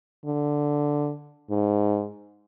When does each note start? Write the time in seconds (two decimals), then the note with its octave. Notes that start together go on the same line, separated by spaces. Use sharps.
0.25 D3
1.51 G#2